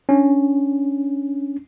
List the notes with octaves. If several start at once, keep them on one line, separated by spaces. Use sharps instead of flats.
C#4 D4